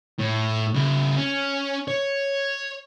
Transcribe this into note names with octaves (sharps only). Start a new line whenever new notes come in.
A2
C#3 E4
C#4
C#5